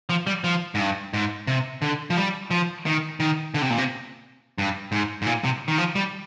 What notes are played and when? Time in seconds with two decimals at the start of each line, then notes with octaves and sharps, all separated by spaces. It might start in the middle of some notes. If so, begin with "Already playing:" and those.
0.09 F3
0.27 G3
0.44 F3
0.75 G#2
0.79 G2
1.13 G#2
1.47 C3
1.82 D3
2.10 F3
2.17 G3
2.51 F3
2.86 D#3
3.20 D#3
3.54 D3
3.62 C3
3.70 A#2
3.78 C3
4.58 G2
4.92 G#2
5.22 G#2
5.27 A#2
5.44 C3
5.68 D#3
5.78 F3
5.95 G3